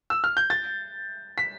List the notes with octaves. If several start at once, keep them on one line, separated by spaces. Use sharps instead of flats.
E6
F6
G6
A6
B6